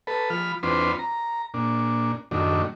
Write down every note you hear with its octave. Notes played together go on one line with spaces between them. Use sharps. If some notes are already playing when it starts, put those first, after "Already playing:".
A4 B4
F3 B5 F6
E2 C4 D4 F4 B4 C6
A#5
A#2 D4
F#2 A2 D#3 D4